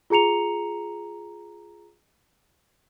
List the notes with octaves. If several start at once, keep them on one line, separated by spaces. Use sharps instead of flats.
F4 G#4 A#5 C#7 F7